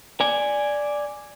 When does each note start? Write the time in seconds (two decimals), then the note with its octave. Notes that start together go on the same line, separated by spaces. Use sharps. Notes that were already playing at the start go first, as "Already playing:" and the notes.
0.20 D5 G#5